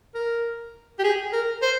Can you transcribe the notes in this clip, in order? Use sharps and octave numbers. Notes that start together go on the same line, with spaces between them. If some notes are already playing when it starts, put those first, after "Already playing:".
A#4
G4
G#4
A#4
C5